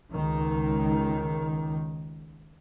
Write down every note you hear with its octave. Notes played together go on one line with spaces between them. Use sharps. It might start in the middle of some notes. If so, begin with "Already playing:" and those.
C#2 D#3